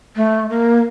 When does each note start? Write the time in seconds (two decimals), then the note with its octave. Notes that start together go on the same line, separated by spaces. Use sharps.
0.16 A3
0.50 A#3